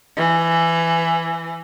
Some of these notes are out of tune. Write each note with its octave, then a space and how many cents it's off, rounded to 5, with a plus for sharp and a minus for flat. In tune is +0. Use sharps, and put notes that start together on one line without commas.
E3 +15